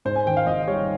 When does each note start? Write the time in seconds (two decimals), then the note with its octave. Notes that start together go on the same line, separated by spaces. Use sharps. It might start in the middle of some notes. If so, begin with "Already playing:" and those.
0.05 G#2 C5
0.16 G#5
0.26 D#3 G5
0.37 F5
0.47 G#1 D#5
0.67 G3 C#5